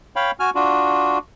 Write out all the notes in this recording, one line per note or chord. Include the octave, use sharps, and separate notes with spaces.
C#5 F5 G5 B5
F#4 G#5 F6
D4 F4 F#4